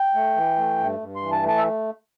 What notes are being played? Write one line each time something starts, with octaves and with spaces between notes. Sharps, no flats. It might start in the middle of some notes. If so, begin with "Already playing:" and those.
Already playing: G5
A3
E3
A3
G2
G2
C6
E3
A5
A3
A5
E5